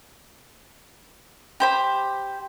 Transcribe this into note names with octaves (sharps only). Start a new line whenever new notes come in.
G4 C5 B5